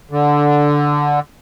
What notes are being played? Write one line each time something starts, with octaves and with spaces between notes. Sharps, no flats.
D3